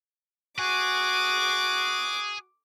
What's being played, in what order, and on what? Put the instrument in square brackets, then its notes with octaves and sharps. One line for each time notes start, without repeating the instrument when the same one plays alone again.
[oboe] F#4 [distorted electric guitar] G#4 [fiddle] D6